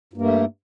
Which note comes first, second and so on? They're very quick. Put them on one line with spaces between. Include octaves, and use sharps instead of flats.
G2 A#3 A3